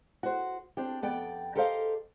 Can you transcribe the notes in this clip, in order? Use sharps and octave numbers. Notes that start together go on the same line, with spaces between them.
F#4 C5
C4 D4 G4
F2 B3 D5 G5
G4 A4 A#4 C5 D#5 F5